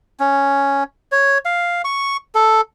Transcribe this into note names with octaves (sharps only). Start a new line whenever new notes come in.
C#4
C#5
F5
C#6
A4